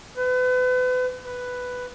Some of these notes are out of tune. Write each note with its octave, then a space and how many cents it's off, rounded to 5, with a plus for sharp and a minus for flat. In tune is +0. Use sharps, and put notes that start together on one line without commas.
B4 +35
B4 +5